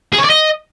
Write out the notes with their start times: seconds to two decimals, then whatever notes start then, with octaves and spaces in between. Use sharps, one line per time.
0.13 G#4
0.18 C#5
0.24 D5
0.30 D#5